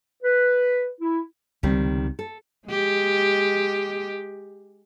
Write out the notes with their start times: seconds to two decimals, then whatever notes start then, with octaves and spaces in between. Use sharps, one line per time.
0.23 B4
1.01 E4
1.63 C#2 C3 D#3 F#3 G3 C4
2.19 A4
2.68 G#3 G4